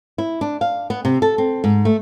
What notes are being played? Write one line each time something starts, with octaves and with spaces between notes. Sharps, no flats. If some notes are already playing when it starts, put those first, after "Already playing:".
E4
D4
F5
B3
C3
A4
C4
G#2
A3